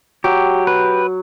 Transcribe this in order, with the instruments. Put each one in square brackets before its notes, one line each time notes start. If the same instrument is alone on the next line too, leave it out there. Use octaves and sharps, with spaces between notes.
[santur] F#3 [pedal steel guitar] G4
[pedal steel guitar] B4